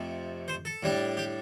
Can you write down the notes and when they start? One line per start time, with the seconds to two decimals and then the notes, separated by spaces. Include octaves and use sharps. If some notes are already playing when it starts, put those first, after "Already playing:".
Already playing: F2 C3 F3 A3
0.48 C5
0.65 A4
0.83 A2 G3 D4
1.17 G4